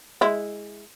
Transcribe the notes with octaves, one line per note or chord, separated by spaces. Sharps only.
G#3 E4